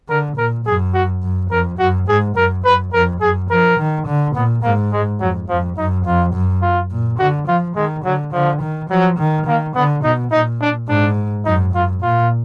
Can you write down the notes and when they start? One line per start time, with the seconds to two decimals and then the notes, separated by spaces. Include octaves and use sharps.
0.09 D3 A#4
0.37 A#2 A#4
0.66 F#2 G#4
0.94 F#4
1.23 F#2
1.51 F2 A#4
1.79 F#2 F#4
2.08 G#2 G#4
2.36 F#2 A#4
2.65 F#2 B4
2.93 F2 A#4
3.21 F#2 G#4
3.50 F3 A#4
3.78 D#3
4.07 D3
4.35 A#2 B3
4.63 G#2 A#3
4.93 G#3
5.20 F2 F#3
5.49 F2 F3
5.78 F#2 D#4
6.06 F2 F4
6.35 F#2
6.62 F4
6.91 A#2
7.19 D3 F#4
7.48 F3 F4
7.76 D#3 G#3
8.04 D3 F#3
8.33 D3 F3
8.62 D#3
8.90 F3 F#3
9.19 D#3
9.46 D#3 A#3
9.75 D3 B3
10.03 B2 D#4
10.32 A#2 D#4
10.61 D4
10.89 G#2 D4
11.46 F#2 D#4
11.74 F#2 F4
12.02 A#2 F4